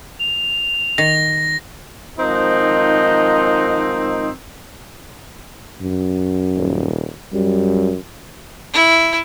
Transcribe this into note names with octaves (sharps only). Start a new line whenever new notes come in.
F7
D#3 A#6
G#2 D#3 F3 C4 D#4
F#2
D#1
F#2 G3
E4